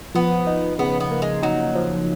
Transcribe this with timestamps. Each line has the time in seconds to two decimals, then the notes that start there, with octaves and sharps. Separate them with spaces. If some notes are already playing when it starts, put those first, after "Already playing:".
0.15 F3 B3
0.47 D#4
0.79 C#3 B3
1.00 B3
1.11 A#3
1.22 G#3
1.43 F#3 D#4
1.75 F3